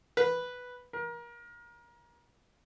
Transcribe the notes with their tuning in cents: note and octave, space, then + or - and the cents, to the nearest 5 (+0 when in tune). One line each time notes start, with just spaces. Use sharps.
B4 +0
A#4 +30